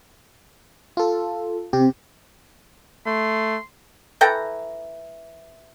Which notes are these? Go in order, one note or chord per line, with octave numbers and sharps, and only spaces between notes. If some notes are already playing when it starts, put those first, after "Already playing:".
F4 A4
C3 C4 G4
A3 C6
E3 A4 G5 A#5